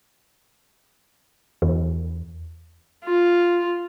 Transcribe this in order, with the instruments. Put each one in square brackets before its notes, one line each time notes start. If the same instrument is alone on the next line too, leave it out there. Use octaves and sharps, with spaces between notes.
[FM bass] E2
[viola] F4